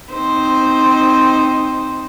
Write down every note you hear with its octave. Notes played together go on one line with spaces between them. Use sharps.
C4 D#4 C5